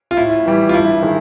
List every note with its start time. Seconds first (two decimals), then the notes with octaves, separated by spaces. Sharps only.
0.11 F4
0.17 A2 E4
0.46 E3 G3
0.69 F4
0.74 G2 E4
1.02 D#3 G#3